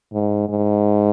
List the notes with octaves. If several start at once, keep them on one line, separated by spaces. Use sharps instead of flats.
G#2
G#2